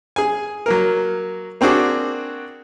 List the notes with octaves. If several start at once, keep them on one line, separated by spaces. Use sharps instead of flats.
G#4 G#5
F#3 A#3 A#4
A#3 C4 D4 F#4 G#4